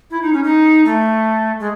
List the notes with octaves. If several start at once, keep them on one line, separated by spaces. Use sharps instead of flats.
E4
D#4
C#4
D#4
A3
G#3